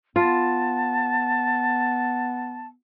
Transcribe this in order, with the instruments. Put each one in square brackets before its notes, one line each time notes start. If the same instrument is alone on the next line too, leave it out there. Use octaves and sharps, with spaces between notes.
[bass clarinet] B3 [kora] F4 [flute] A5